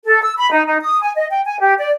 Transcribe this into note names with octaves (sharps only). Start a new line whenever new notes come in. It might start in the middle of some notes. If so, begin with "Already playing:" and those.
A4
E6
B5
D#4
D#4
D#6
G#5
D#5
G5
G#5
G4
D5